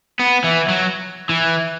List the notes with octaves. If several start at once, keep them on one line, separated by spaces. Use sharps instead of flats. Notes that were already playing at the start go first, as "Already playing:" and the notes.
B3
E3
F#3
E3